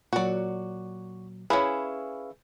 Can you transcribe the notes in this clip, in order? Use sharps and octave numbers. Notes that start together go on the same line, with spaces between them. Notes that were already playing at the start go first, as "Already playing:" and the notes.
A#2 F#3 F#4 D5
C#4 E4 G#4 B4 F5